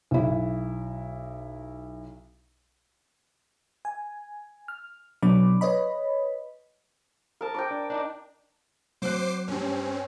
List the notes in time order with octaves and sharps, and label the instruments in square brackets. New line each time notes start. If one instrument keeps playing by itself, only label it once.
[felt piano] B1 E4
[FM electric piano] G#5
F6
B2 F#3 D4 B5 D6
B4 C#5 D#5 B5
[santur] A#4 A5
G5 A#5 D6
[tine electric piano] D4
D4 D#4
[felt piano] F#3 C4 F#6 [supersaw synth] C5 D6 C7
[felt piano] G2 G3 [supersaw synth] C4 C#4